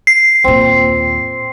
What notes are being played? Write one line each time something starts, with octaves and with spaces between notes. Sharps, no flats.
C7
D#2 A#2 C4
C6